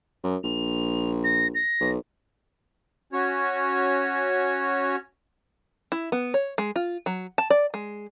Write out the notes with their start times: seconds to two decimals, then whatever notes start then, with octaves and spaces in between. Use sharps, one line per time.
0.24 F#2
0.44 A#1 F7
1.24 A#6
1.55 A#6
1.81 B1
3.13 C#4 F#4 C#5
5.92 E4
6.12 B3
6.34 C#5
6.58 G#3
6.76 F4
7.06 F#3
7.38 A5
7.50 D5
7.74 G#3